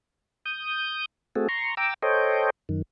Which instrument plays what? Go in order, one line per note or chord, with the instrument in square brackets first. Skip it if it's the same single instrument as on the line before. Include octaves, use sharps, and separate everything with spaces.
[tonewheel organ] D#6 G6
A3 C4 F#4 G#4 A4
A#5 C6 C#6
G5 A#5 D6 E6
A4 C5 C#5 D#5 G5
F#2 D#3